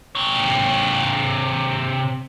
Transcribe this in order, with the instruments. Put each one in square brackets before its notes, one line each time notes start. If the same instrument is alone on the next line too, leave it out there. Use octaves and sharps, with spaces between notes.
[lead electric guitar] C3 C#5